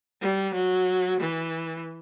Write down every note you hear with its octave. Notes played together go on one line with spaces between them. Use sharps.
G3
F#3
E3